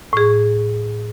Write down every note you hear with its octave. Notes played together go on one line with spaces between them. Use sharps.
A2 G#4